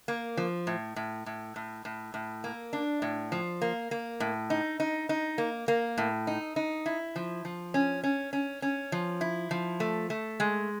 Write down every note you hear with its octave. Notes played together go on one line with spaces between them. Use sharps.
A#3
F3
A2
A2
A2
A2
A2
A2
A#3
D4
A2
F3
A#3
A#3
A2
D#4
D#4
D#4
A#3
A#3
A2
D#4
D#4
E4
F3
F3
C#4
C#4
C#4
C#4
F3
E4
F3
A3
A3
G#3